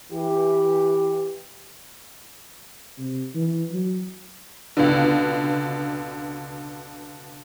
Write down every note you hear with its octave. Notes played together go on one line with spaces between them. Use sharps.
E3 G4
C3
E3
F#3
C#2 B2 D3